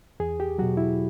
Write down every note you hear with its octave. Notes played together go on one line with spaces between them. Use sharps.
E2 G#4
G4
B2 F#3 F#4
E4